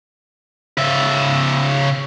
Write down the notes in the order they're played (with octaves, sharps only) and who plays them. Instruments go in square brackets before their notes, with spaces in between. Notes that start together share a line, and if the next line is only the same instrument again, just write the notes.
[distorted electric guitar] C#3 E5